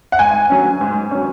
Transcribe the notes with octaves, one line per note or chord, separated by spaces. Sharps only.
F#5
G#2 G#5
F#3 C#4
G#2
F#3 C#4